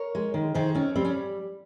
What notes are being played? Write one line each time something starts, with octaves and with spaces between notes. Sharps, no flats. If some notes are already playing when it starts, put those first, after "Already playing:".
Already playing: A#4 C#5
G#3
D#3
D#3 G#4 C5
C4 C#4
G3 C4
C#4